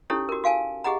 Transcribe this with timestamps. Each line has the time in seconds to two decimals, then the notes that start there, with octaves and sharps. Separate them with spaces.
0.10 C#4 D#4 E4 G4 A4 C#5
0.29 F#4 A#4
0.44 F#4 F5 G#5 A5
0.84 G4 G#4 D#5 F#5 A#5